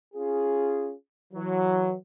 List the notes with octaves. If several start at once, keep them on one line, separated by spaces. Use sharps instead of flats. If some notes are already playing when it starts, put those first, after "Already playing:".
C#4 F4 G#4
E3 F#3